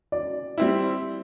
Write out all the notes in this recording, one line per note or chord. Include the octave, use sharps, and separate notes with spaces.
D5
G3 C4 E4